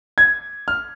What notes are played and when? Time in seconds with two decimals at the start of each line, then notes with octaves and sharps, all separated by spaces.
0.18 G#6
0.68 F6